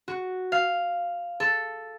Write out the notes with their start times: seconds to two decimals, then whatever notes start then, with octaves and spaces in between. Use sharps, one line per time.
0.08 F#4
0.52 F5
1.40 A4